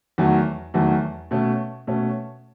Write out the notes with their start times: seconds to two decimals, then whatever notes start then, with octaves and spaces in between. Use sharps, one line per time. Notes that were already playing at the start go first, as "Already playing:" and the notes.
0.18 E2 D#3 F#3 A3
0.74 E2 D#3 F#3 A3
1.31 B2 A3 C#4
1.87 B2 A3 C#4